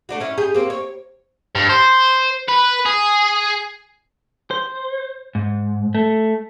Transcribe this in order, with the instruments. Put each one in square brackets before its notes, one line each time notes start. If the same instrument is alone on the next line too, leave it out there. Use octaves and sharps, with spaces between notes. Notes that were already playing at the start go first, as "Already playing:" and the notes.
[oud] A3 D4 F#4
C#4 E4
G4 G#4
A#3 C4
C#5
[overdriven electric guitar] G2
C5
B4
G#4
[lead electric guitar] C5
G#2
A3